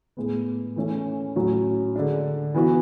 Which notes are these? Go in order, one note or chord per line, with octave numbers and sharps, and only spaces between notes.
A2 G#3 B3
E3 A3 C#4 E4
A2 F#3 C#4 F#4
D3 G#3 D4
E3 B3 F#4